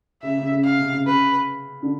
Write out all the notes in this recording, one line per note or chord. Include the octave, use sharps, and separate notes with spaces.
C#3 E5
C#3
C#3
F5
C3
C#3
C#3 B4
D3